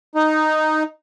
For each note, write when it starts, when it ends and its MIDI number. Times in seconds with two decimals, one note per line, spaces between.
0.15 0.83 63